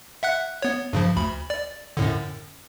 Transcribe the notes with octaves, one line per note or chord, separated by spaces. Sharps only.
E5 F#5 F#6
B3 C#5
G2 C#3 F3
D2 B5
D5
F#2 A2 D3